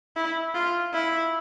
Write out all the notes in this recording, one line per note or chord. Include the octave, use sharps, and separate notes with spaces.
E4
F4
E4